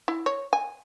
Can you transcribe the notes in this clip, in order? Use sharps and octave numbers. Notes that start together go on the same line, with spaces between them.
E4
C#5
G#5